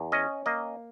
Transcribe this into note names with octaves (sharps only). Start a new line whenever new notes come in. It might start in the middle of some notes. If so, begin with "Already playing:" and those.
Already playing: E2
C#4 D#5
A#3 D#5